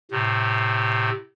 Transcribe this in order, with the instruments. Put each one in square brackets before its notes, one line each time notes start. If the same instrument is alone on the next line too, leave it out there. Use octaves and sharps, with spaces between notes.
[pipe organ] A2 C3